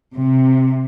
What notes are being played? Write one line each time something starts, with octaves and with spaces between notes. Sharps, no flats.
C3